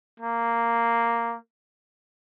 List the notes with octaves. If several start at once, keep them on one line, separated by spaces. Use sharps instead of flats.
A#3